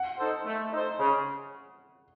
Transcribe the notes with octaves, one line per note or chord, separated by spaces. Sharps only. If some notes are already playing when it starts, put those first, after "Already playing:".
Already playing: F#5
D#4 A4 C5
A3
D#4 A4 C5
C#3